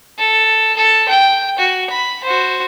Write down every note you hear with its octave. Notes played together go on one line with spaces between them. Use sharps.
A4
A4
G5
F#4
B5
F#4 C5